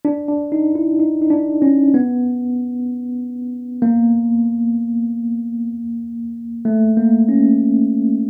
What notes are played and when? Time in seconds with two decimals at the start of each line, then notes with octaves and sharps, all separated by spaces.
0.05 D4
0.28 D4
0.52 D#4
0.75 E4
0.99 D#4
1.22 D#4
1.30 D4
1.62 C#4
1.94 B3
3.82 A#3
6.65 A3
6.97 A#3
7.29 C#4